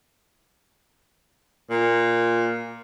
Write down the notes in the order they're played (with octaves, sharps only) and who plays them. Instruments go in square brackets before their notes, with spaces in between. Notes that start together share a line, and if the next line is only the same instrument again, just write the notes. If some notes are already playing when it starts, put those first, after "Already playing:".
[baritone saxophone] A#2